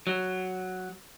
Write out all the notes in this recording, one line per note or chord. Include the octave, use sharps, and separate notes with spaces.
F#3